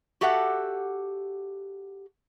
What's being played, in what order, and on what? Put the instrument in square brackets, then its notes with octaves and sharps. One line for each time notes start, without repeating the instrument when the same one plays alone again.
[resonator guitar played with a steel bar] F#4 G4 A4 E5 F#5